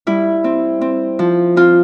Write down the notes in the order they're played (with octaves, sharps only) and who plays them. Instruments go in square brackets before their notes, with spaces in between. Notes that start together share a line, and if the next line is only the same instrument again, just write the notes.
[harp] G3 E4
C4
C4
F3
C4 F4